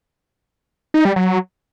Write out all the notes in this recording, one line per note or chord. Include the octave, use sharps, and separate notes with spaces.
D#4
G3
F#3